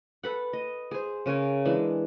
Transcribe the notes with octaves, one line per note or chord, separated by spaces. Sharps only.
A4 B4 F#5
D#5
G#4 C5
C#3 C#4 A#4 C#5
E3 G#3 D4